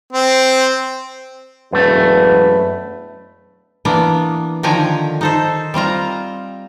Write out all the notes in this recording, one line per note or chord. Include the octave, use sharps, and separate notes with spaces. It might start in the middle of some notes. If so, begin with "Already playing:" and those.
C4
E1 F#2 A3 B4
E3 A#3 B3 D4
D3 D#3 F3 G5 G#5 A#5
D#4 A4 C5
G3 C4 F4 A#5